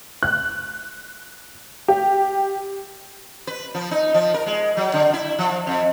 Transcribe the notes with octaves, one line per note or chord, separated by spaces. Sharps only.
F#6
G4
B4
F3
D#4
F3
A#4
G#3
F#3
D3
E4
F3
F2